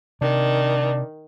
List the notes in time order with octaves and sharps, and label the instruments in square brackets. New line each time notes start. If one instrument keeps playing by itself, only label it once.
[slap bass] C3 [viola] D#3 [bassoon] D4